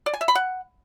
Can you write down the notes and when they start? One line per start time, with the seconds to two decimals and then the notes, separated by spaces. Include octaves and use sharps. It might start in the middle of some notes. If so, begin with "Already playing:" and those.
0.06 D5
0.14 G#5
0.21 E5
0.28 B5
0.35 F#5